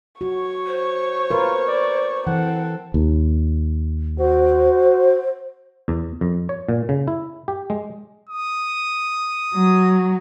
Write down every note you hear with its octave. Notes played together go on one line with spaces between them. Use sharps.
F#4 C#5 C#6
C5
F4 A#4 B4
D5
E3 C4 A4 F#5
D#2
F#4 C5
E2
F2
C#5
A#2
C#3
E4
G4
G#3
D#6
F#3